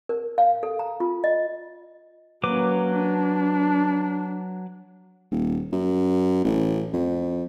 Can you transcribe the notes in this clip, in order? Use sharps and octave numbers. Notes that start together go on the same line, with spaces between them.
A#4
F5
A4
A#5
F4
D#5
F#3 A#3 C#4 B4 D6
D4
D#1
F#2
A1
F2